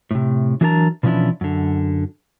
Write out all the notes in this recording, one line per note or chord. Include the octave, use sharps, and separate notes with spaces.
A2 C3
E3 F#3 D4 A#4 A5 A#5
B2 E3 F3 C#4 D4 E4
F#2 D3